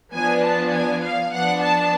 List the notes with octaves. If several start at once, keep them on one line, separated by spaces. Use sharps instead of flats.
F3 B3 D4 G#5
A5
G#5
F5
F3 B3 D4 F#5
A5